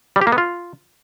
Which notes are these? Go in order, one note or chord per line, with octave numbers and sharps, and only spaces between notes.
G3
G4
A#3
B3
F4